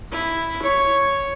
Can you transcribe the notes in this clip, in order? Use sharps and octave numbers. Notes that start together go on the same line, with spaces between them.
E4
C#5